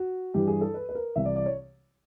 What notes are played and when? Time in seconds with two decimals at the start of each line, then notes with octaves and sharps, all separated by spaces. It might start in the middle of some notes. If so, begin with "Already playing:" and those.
Already playing: F#4
0.34 G2 E3 G4
0.47 G#4
0.61 A4
0.74 B4
0.89 B4
0.95 A#4
1.16 C2 C3 E3 E5
1.25 D5
1.36 D5
1.46 C#5